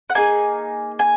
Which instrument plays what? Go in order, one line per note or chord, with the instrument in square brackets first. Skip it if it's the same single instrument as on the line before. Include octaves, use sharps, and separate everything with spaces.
[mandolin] F#5
A#3 D#4 G#4 G#5
G#5